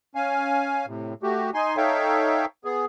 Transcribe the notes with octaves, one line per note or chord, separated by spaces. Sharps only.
C#4 F5 G#5
A2 C3
A3 F#4 G4
D#4 G#5 C6
D#4 A4 C#5 E5 F5 G5
B3 G#4